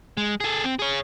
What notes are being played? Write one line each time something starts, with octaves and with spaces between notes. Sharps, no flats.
G#3
G#4 A4
C4
G#4 C#5